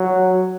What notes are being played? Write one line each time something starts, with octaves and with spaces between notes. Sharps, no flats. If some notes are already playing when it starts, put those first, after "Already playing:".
Already playing: F#3